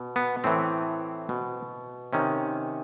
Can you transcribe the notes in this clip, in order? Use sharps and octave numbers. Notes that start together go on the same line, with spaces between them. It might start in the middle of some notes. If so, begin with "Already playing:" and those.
Already playing: B2
B3
A2 E3 C4
B2
C3 D#3 C#4